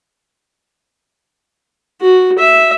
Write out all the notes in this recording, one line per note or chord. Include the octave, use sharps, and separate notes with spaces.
F#4
E5